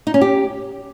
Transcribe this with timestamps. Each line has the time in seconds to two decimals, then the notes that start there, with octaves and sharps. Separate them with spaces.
0.07 D#4
0.14 C#4
0.21 G4